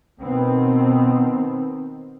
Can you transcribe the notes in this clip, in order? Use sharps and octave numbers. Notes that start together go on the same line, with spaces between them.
B2 D#3 B3 C4